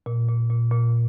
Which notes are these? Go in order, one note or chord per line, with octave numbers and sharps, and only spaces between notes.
A#2
A#2
A#2
A#2